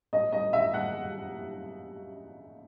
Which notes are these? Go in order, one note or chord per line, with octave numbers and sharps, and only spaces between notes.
D#5
D#5
E5
F#5